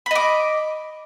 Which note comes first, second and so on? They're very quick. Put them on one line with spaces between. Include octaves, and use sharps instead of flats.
B5 D#5 D6